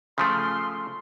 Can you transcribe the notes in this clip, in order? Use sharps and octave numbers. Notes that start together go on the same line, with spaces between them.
C#3 F3 A3 C6